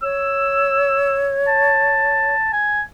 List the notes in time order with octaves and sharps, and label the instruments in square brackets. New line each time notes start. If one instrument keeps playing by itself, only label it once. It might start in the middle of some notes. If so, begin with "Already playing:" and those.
[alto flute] C#5 [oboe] E6
[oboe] A5
G#5